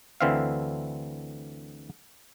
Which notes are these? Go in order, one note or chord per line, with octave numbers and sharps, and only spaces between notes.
D2 D3 E3 C4 E5 F5